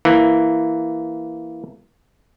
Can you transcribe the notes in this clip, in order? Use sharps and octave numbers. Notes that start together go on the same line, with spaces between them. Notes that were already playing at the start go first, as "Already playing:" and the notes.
E3 A#3